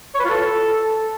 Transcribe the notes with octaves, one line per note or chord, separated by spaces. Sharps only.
C#5
B4
F4
A4